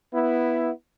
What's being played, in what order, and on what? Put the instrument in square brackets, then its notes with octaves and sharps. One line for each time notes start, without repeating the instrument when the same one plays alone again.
[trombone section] B3 E4